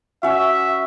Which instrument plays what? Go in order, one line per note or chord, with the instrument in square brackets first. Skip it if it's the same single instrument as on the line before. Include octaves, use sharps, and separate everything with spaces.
[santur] C#4 F#4 [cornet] E5